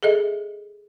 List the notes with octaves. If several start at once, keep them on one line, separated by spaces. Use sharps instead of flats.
G#4 A4 D#5 E5